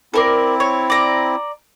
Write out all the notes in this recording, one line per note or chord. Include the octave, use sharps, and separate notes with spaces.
C4 E4 A4 A#4 D5
C#5
D5 A#5